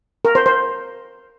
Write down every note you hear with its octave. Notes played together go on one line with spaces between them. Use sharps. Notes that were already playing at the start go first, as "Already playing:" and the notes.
A#4
C5
C5